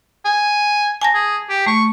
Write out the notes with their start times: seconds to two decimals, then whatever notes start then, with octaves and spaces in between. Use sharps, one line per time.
0.25 G#5
1.02 G#5 A5 A#6
1.14 G#4
1.49 G4
1.66 A3 C#6